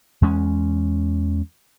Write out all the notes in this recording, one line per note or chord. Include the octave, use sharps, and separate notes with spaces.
E2 G#3 C#4